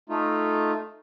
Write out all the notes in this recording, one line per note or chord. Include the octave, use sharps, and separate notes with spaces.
A3 D#4 F4